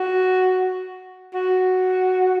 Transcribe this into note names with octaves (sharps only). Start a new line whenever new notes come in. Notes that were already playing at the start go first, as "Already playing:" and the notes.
Already playing: F#4
F#4